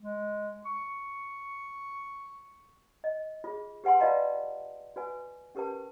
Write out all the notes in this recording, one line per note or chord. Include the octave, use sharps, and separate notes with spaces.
G#3
C#6
D#5
F4 G#4
G4 B4 F#5 G#5 C6
F4 B4 D5 D#5 F5 A5
F#4 B4 G#5
C#4 G4 A#4 B4 A5